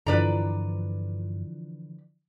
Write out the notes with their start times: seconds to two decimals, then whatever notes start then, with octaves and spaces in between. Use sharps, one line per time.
0.07 G2 D3 E3 F3 B4 D5 A#5